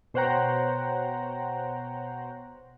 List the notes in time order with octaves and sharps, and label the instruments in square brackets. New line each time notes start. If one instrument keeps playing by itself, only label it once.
[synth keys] B2 C5 C#5 F#5 G5 A#5